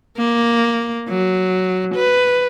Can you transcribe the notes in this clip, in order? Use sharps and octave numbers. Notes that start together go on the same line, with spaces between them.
A#3
F#3
B4